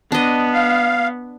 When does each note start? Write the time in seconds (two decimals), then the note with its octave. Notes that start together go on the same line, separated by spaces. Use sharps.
0.12 B3 D4 D#5
0.53 F5